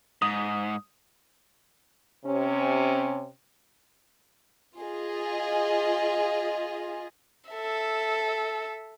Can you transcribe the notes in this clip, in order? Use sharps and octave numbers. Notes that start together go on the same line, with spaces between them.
G#2 D#6
C3 C#4
F4 G#4 D#5
A4 E5